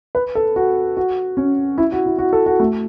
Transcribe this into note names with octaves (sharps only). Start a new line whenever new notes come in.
B4
A4
F#4
F#4
C#4
E4
F#4
E4
F#4
A4
F#4
A3